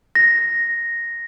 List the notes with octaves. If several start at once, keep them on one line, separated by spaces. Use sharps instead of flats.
A#6